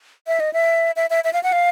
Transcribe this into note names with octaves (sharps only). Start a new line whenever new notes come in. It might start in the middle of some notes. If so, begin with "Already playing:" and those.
E5
D#5
E5
E5
E5
E5
F5
F#5
F5